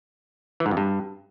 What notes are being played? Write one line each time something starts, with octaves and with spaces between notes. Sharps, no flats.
E3
G#2
F2
G2